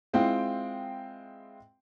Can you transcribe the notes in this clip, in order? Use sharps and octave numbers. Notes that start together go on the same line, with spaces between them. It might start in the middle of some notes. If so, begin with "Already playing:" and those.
G#3 C4 E4 F4 G5